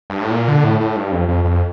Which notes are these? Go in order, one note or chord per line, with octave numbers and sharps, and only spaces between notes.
G2
A2
A#2
D3
A2
A2
G2
F2
F2
F2